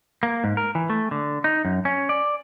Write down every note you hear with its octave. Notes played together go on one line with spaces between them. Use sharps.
A#3
G#2
A#4
E3
A3
D3
D#4
F#2
C#4
D5